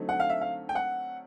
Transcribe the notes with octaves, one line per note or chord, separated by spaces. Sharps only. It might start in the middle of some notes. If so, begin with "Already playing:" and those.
Already playing: D3 F#3 A3 C4 D#4
F#5
F5
E5
F5
G5
F#5